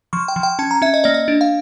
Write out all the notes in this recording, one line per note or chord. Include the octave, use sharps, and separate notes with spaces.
F3 C#6
G5
F3
G5
C#4 A5
A#5
C#4 E5
D#5
A#3 D5
D#5
D4
F5